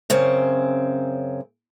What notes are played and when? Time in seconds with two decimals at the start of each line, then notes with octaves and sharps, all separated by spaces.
0.10 F#2 C#3 C4